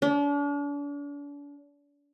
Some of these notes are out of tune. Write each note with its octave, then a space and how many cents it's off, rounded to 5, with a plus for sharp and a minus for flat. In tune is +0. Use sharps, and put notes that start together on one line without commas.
D4 -40